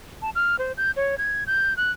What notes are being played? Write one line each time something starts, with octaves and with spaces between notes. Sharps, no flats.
A5
F6
C5
G6
C#5
G#6
G6
F#6